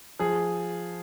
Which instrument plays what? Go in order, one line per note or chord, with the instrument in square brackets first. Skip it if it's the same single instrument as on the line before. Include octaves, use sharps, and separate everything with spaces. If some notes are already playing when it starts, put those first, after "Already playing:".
[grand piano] F3 [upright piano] G#4